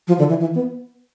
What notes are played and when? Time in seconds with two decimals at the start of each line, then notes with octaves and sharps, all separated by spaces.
0.08 F3
0.18 D3
0.29 E3
0.40 E3
0.55 B3